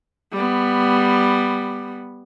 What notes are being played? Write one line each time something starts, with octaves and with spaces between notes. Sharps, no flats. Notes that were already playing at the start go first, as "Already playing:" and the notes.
G3 B3